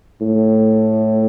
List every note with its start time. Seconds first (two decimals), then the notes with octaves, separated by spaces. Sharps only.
0.21 A2